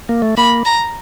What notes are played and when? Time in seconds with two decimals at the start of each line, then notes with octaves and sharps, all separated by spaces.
0.09 A#3
0.22 A3
0.37 A#3 B5
0.65 A#5